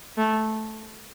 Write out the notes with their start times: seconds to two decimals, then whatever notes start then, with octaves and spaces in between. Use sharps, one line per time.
0.17 A3